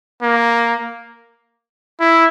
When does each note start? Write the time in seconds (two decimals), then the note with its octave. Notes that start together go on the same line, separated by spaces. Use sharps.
0.22 A#3
2.00 E4